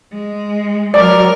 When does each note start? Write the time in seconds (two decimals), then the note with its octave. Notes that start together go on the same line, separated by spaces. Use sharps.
0.12 G#3
0.94 F#3 A#4 D5 F6